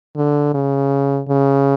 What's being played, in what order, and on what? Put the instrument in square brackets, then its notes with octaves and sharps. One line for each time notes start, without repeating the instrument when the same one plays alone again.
[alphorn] D3
C#3
C#3